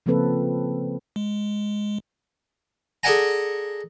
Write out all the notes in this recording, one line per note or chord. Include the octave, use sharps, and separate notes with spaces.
C#3 F3 A#3 C4 A4 B4
G#3
G#4 A4 D5 F#5 G#5 A#5